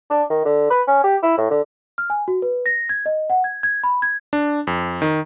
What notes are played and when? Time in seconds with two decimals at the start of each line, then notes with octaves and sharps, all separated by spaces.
0.10 D4
0.30 D#3
0.45 D3
0.71 B4
0.87 C#4
1.04 G4
1.23 E4
1.38 A2
1.50 D3
1.98 F6
2.10 G#5
2.28 F#4
2.42 B4
2.66 A#6
2.89 G#6
3.06 D#5
3.30 F#5
3.44 G#6
3.63 G#6
3.84 B5
4.02 G#6
4.33 D4
4.67 F2
5.02 D#3